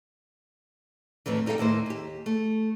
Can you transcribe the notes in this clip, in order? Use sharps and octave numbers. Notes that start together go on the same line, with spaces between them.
F2 A2 D#3 E3
G3 D#4 A4 F5 G5
D#2 A2 A#3 C5
D#2 G4
A3